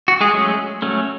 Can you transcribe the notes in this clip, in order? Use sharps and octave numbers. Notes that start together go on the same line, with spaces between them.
F#4
G#3 G#4
F#3 A3 C#4
F#3 A3 C#4